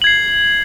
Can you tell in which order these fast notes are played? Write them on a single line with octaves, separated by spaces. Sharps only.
F#7 G#6 C7